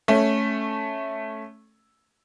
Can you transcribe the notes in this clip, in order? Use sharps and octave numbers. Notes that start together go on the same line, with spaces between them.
A3 C#4